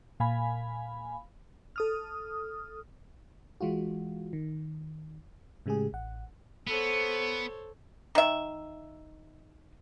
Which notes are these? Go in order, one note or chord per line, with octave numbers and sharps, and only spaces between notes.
A#2 F5 G#5 B5
A4 D#6 F6
E3 G#3 F4 F#4
D#3
A2 C#3 G#3 G4 G#4
A1 F#5
B3 A4 C5 C#5
D#3 E5